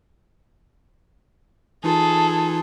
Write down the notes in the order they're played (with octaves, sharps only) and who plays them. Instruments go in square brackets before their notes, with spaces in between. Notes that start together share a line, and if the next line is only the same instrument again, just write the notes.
[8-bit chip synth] E3 D#4 F4 [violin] G#4 A4